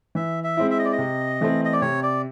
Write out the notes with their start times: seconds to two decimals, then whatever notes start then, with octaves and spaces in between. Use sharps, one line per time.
0.15 E3 E5
0.44 E5
0.57 G#3 C4 E4
0.71 E5
0.79 D#5
0.85 D5
0.93 D#5
0.98 C3
1.41 E3 A3 C4
1.65 D#5
1.73 D5
1.81 C3 C#5
2.03 D5